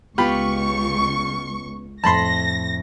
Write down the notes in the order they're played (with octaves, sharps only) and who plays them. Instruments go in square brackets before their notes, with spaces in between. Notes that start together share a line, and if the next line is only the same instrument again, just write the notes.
[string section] C#2 C#6 [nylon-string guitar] B3 [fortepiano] F4 G4 B5
[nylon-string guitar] F2 A2 C4 [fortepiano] A5 B5 C6 [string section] A#6